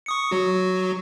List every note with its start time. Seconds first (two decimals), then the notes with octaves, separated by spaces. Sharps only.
0.06 C#6 D#6 C#7
0.31 F#3 F#4